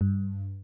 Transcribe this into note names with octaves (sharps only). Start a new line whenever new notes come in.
G2